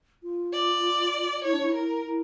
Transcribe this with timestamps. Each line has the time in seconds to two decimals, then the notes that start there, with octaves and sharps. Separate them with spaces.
0.23 F4
0.53 D5
1.45 E4 C#5
1.53 D4
1.62 E4
1.75 E4 A#4
2.05 E4